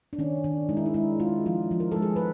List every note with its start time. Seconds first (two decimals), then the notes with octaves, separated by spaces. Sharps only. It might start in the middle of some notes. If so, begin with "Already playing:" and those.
0.13 D4
0.18 D#3 C#4
0.44 D#3 D4
0.69 G#3 D#4
0.77 E4
0.86 D#4
0.94 G#3 E4
1.20 G#3 F4
1.46 F3 F4
1.71 F3
1.80 A#4
1.91 G#3 A4
2.02 G#4
2.16 B4